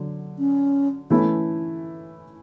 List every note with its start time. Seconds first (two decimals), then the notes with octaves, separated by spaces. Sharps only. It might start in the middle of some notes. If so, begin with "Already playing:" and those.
Already playing: D3 F#3
0.39 C#4
1.10 E3 A3 B3 C#4 E4